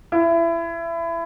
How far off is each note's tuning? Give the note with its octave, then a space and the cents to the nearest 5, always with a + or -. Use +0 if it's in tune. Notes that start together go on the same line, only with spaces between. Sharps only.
E4 +25